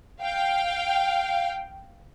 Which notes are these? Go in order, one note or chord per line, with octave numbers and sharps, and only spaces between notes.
F5 G5